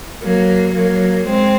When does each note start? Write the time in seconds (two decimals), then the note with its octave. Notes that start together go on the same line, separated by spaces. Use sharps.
0.22 F#3 A#3
0.74 F#3 A#3
1.26 G#3 C4